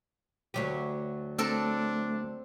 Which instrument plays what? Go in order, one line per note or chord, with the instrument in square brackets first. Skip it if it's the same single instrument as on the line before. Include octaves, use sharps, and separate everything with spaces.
[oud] D2 F#3 G4
[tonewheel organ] A3 [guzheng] C4 A4 A#4 [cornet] D4